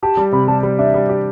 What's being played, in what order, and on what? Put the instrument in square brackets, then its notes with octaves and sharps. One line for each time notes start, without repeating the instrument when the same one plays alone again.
[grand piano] G4 [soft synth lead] A5
[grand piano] G3
[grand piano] C3 [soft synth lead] B5
[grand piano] G3 [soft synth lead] A5
[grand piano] G3
[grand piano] D4 [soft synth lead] E5
[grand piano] G3
G4